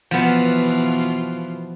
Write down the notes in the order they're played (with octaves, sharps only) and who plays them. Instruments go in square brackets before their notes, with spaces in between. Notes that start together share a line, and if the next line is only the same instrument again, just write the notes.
[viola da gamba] B2 E3 F4 [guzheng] F3 B3